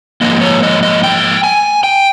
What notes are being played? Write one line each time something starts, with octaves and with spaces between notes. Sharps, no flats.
G#2 F3 A#3 D#5
C#5
D#5
D#5
G5
G#5
G5